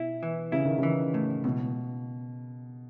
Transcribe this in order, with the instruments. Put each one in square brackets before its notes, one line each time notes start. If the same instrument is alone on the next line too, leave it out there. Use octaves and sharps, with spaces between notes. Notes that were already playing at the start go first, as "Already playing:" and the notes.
Already playing: [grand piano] B2 [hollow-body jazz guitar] E4
[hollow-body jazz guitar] E3
[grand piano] C#3 [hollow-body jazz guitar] E4
[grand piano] D#3
[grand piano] C#3 [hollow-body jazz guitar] E3
[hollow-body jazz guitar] A2
[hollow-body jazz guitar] C#2 [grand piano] B2